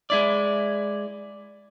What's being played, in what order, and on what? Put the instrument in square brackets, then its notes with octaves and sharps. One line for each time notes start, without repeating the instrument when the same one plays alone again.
[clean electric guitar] G#3 E4 D5